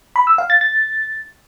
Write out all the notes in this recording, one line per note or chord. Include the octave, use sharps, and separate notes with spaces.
B5
E6
F5
A6
A6